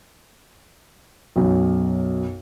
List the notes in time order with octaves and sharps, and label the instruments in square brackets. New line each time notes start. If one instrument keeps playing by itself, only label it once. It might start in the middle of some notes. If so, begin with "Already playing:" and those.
[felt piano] B1 F#2